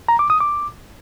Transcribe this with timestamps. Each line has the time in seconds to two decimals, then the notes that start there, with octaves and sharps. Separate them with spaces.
0.09 A#5
0.19 D6
0.30 D#6
0.40 D6